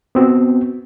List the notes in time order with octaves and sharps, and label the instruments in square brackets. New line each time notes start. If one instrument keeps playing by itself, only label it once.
[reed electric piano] B3 C4 F#4